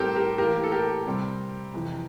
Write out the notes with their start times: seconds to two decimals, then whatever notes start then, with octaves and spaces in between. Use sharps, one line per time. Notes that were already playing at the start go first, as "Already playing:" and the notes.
Already playing: A2 G3 C4 G4 A4 A#4 C5
0.15 G4 A#4
0.38 A2 E3 A#3 G4 A#4
0.64 A4
0.72 G4 A#4
1.06 C3 G3 C4
1.74 F2 C3 E3